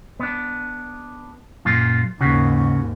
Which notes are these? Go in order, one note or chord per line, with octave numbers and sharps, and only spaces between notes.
B3 D4
F#2 A#2 F4
D#2 G#2 C#3 F#4